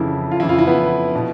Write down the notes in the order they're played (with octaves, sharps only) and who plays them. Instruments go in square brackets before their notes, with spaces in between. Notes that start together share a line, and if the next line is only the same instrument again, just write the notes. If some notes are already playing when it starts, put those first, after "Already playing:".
Already playing: [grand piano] F2 C#3 E3 E4
F4
F2 C#3 E3 E4
F4
E4
B3
B2